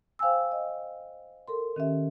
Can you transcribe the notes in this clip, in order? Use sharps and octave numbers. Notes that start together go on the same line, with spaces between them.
C5 F5 G5 G#5 E6
D#5
A4 A#4 C6
D#3 C#4 G4 E5